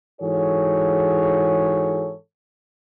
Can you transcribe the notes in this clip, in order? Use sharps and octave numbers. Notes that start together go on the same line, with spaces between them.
G#2 E3 F#4 G#4 A4 C#5